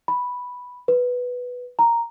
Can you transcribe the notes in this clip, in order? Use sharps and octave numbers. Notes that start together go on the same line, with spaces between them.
B5
B4
A#5